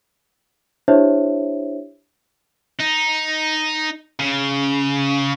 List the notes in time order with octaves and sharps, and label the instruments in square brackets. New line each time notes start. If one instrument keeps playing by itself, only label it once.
[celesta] D4 E4 G4 C5 C#5 E5
[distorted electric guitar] D#4
C#3